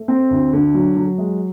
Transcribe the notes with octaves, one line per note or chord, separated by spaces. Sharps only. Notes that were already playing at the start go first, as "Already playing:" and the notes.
Already playing: A3
C4
D2
D3
F#3
F#3
G#3